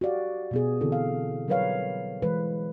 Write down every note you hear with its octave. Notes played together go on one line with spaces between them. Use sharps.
F#4 G4 D5 F5
B2 B3 G#4
D3 E3 C4 E4 A4
F5
F#3 G3 A#4 B4 C#5 F5
E3 G#3 B4 C5